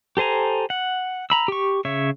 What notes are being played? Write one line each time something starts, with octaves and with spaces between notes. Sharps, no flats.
G4 A4 C5 G#5 A#5
F#5
A#5 B5 E6
G4 C#6
C#3 C#5 E5